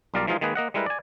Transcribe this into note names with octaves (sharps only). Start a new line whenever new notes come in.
B1 G3 F4 A#4 D5 F5
E3 F3 G#3 D#4 F4 G#4
D#3 G#3 A#3 G#4 B4
A#3 D#5 F#5
G3 G#3 E4 A#4 B4
D5 G#5